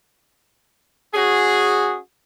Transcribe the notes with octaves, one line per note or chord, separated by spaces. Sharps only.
C#4 F#4 G#4